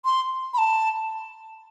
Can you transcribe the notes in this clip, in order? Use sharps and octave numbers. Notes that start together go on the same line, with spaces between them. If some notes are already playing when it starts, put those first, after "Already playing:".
C6
B5
A5